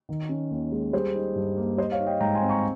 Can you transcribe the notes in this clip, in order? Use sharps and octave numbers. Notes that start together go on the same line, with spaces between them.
D#3
C#4
D#2
G#3
G3 G#4 C5
D#4
G2
A#3
G3 C5 D#5
C#5 F5
D#4
D#5 G5
G#2 G5 A#5
G#5 C6
C4
A#5 C#6